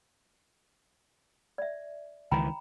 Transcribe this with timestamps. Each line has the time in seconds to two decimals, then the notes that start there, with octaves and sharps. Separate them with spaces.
1.58 D5 E5
2.31 C#2 D#3 E3 G5 A#5 B5